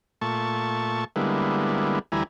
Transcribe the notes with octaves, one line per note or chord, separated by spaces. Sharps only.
A#2 A3 A5 C#6
D3 G3 G#3 A#3 B3 E4
D2 E3 G3 E4 G#5 A#5